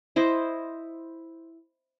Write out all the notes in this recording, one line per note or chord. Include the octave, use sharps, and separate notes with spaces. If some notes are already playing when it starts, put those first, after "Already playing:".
E4 C5 D#5